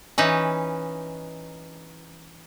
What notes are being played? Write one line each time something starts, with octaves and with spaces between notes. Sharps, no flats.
E3 C#4 D#4 B4